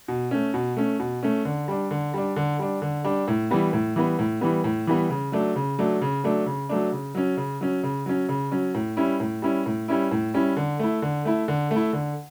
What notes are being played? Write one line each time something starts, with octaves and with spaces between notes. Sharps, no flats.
B2
A3 C#4
B2
A3 C#4
B2
A3 C#4
D3
G3 D4
D3
G3 D4
D3
G3 D4
D3
G3 D4
A2
E3 G3 B3
A2
E3 G3 B3
A2
E3 G3 B3
A2
E3 G3 B3
C#3
F#3 A3 D4
C#3
F#3 A3 D4
C#3
F#3 A3 D4
C#3
F#3 A3 D4
C#3
F#3 C#4
C#3
F#3 C#4
C#3
F#3 C#4
C#3
F#3 C#4
A2
G3 C#4 E4
A2
G3 C#4 E4
A2
G3 C#4 E4
A2
G3 C#4 E4
D3
A3 E4
D3
A3 E4
D3
A3
E4
D3